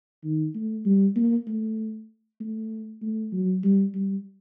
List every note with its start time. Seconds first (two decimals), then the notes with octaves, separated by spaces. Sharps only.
0.24 D#3
0.55 A3
0.86 G3
1.16 A#3
1.48 A3
2.40 A3
3.02 A3
3.33 F#3
3.64 G3
3.95 G3